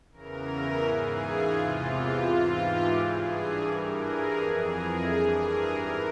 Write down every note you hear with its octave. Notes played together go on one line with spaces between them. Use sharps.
E2 C#3 E3 A#4
G#2 E3 G#4
F4
E2 C3 E3 F4
G#2 E3 F4
G4
G2 E3 G#4
G2 E3 A#4
G#4
F2 E3 G#4
A#4
G2 E3 G#4
A#4
G#2 E3 A#4